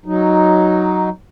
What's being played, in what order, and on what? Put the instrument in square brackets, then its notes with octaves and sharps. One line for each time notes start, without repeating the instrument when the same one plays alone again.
[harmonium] F#3 D#4